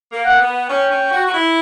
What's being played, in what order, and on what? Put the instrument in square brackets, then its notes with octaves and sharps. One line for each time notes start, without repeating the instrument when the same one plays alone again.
[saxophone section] A#3
[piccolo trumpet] F#5
[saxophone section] B3
[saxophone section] C#4 [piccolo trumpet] G5
[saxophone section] C#4
F#4
F#4
E4